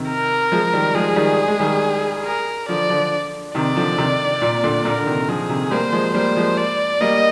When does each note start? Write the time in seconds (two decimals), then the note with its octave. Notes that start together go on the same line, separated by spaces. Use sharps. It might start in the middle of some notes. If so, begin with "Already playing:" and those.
Already playing: C3 D#3
0.09 A#4
0.52 F3 G#3
0.73 D#3 G3
0.95 F3 G#3 G#4
1.16 D#3 G3
1.48 G#3
1.60 D#3 G3
2.25 A#4
2.68 D3 F3 D5
2.89 D3 F3
3.55 C3 D#3 D5
3.76 D3 F3
3.98 C3 D#3
4.42 A#2
4.64 A#2 D3
4.85 A#2 D3 A#4
4.98 D3
5.06 C3 D#3
5.28 D3 F3 G#4
5.50 C3 D#3
5.71 G3 A#3 C5
5.92 F3 G#3
6.14 G3 A#3 C5
6.37 F3 G#3
6.58 D5
7.01 G3 A#3 D#5